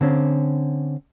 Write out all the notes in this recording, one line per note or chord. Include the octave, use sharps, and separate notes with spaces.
D3 C4 C#4